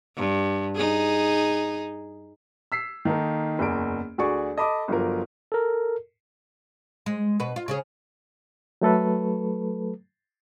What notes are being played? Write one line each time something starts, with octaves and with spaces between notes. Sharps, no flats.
G2
D#4 G#4
E6 B6 C7
D#3 A#3 D#4 A4 A#4
F#1 E2 D7
D2 F#4 G#4 D5 C#6
A4 D#5 A5 B5 D6 D#6
G1 F3 F#3 F4 A#4
A4 A#4
G#3
B2 B4
F4
C#3 C#4 G#4
F#3 A3 A4 B4